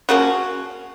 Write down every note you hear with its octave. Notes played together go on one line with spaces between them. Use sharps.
C#3 F3 A#3 C#4 F#4